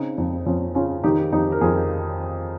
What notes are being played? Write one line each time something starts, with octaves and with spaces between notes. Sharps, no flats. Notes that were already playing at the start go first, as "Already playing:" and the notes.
Already playing: C#3 C4 D#4
F2 C4 D#4
F2 C#4 F4
C#3 C#4 F4
D#3 D#4 G4
F2 D#4 G4
A#4
F2 F4 G#4